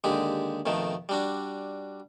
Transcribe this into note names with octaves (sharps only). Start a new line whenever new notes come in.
D#2 D3 G#3 G4
F2 B2 D#3 A3
G3 D4 F#4